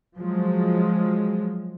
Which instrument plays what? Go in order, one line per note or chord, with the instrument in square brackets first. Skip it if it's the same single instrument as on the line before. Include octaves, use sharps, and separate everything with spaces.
[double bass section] F3 F#3 G#3